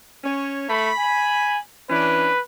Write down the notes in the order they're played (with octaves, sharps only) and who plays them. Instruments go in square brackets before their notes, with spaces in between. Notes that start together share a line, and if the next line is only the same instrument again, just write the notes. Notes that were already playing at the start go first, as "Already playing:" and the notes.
[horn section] C#4 C#5
[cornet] A3 [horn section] B5
[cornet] G#5
[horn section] E3 C#4 D4 [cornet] B4